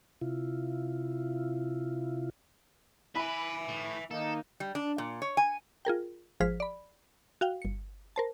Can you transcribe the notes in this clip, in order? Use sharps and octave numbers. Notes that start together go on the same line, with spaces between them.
C3 E4 F4
E4 B4 E5 G#5 B5
A2
D#3 A#3 D#4 A4
G3
D4
A#2
C#5
G#5
F4 G#4 A#4 G5
G#1 F3 G#4 C5 F6 B6
D5 B5
F#4 F5 G5
G1 C#7
A#4 C5 A5